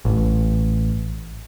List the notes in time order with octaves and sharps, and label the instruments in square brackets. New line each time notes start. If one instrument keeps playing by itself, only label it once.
[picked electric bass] A1